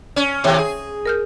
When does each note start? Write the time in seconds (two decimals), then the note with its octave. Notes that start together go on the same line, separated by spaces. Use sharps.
0.16 C#4
0.44 D#2 A2 C3 C#5 E5 G5
0.58 G#4
1.06 A#4 F6 G6